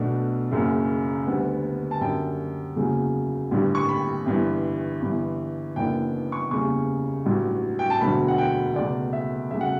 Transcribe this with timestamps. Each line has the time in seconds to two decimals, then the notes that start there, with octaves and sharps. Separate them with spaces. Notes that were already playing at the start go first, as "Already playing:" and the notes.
Already playing: B1 B2 A3 D4
0.51 F#1 F#2 C#3
1.26 D2 D3 G3 B3
1.91 A5
2.01 F#2 D3 G3 D4 G5
2.76 F#1 E2 C#3 F#3
3.51 A1 G2 D3 G3
3.75 C#6
3.89 B5
4.26 G1 G2 E3
5.01 G1 G2 E3
5.76 F#1 F#2 E3 B3 D4 G5
6.32 C#6
6.51 F#1 E2 C#3 G3 C#6
7.26 A1 G2 F#3
7.79 G5
7.90 A5
8.01 E1 D2 D3 F#3 B5
8.28 F#5
8.38 G5
8.75 C#2 B2 A3 D5
9.13 E5
9.51 E2 C#3 F#3 A3 E5
9.61 F#5